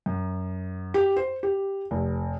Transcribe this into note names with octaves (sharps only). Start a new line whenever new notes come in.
F#2
G4
C5
G4
F1